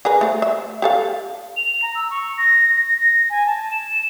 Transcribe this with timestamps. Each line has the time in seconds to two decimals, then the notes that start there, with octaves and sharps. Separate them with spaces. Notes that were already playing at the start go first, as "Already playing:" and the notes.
0.05 G#4 A#4 B4
0.21 A3 C5
0.42 E5
0.82 G4 A4 F5
1.57 F7
1.82 A#5
1.95 E6
2.11 C#6
2.38 A#6
2.76 A#6
2.97 A#6
3.30 G#5
3.47 A5
3.71 E7